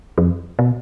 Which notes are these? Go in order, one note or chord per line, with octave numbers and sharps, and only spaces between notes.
F2
B2